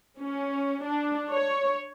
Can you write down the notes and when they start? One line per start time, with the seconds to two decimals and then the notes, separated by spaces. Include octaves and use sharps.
0.19 C#4
0.84 D4
1.31 C#5